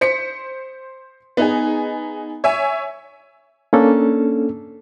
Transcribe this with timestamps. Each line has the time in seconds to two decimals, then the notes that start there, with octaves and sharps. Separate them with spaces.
0.01 C5 B6 C#7
1.37 B3 D#4 G#4
2.44 C#5 E5 G#5
3.73 A#3 C#4 D4 A4